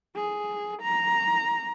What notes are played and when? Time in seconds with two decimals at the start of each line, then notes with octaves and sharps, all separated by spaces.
0.16 G#4
0.83 A#5